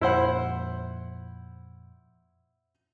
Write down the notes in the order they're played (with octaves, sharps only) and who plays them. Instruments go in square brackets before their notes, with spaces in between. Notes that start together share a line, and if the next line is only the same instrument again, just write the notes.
[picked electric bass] F2 A#2 [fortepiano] E4 C5 F#5